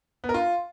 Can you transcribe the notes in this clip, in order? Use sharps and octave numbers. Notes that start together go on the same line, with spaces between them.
B3
A#4
F4